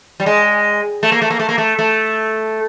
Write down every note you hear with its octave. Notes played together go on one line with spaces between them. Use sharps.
G3
G#3
A3
A#3
A3
A#3
A3
A#3
A3
A3